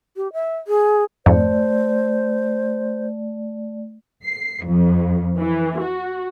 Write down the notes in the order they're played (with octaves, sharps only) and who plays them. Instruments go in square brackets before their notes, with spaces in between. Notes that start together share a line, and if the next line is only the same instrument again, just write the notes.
[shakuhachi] G4
E5
G#4
[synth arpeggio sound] F2 G#2 [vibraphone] A3 D5 [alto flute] C5
[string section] C7
F2
E3
F#4